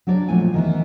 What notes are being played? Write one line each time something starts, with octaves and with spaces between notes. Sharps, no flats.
F#3 D4 C#5 D5
A#2 F3 F#3 A3 C4 G#5
D#3 E3 B3